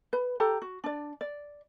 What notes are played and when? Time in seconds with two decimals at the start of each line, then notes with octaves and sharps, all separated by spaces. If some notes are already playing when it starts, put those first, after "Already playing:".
0.13 B4
0.40 G4 A4 A#5
0.62 F#4
0.84 D4 D5
1.21 D5